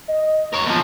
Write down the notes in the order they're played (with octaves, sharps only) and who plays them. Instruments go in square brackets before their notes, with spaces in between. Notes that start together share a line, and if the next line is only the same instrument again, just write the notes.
[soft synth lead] D#5
[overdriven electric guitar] A#4 C#5
E2 F3